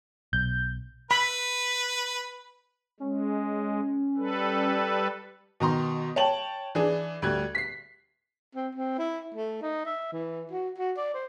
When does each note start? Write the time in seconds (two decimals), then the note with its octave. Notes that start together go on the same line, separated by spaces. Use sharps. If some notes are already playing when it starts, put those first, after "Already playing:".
0.33 B1 G6
1.11 B4 B5
3.00 G#3 C#4
4.17 G3 A4 B4
5.60 B2 D#3 A#5 C6
6.16 C#5 G5 A5 F#7
6.75 E3 D4 G#4
7.22 D2 G3 F#6 G#6
7.55 B6 C7
8.55 C4
8.75 C4
8.98 E4
9.34 A3
9.62 D#4
9.86 E5
10.12 E3
10.51 F#4
10.78 F#4
10.97 D5
11.14 C5